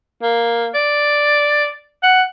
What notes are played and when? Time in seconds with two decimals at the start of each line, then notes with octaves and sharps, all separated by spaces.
0.22 A#3
0.75 D5
2.03 F#5